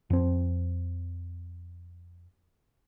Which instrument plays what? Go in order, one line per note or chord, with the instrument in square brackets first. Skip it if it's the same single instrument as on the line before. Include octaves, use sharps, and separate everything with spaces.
[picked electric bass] F2 C4